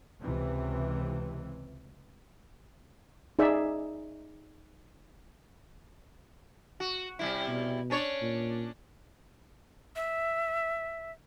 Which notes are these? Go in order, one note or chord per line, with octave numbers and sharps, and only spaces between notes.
C#2 C3 E3
D#4 G#4 D5 E5
F#4
C3 G3 E4
B2
C#4 D4 C#5
A#2
E5